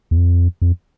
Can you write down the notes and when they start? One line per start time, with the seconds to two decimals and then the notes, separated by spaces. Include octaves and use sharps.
0.11 E2
0.17 F2
0.62 F2